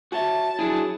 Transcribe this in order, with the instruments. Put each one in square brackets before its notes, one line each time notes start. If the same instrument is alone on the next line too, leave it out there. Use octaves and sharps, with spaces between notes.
[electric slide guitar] F#4 C#5 E5 [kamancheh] A5
[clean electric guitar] F#3 D4 G#4 [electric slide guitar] E4